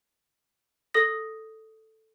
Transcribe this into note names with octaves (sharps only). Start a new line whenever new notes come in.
A4 D#6 A#6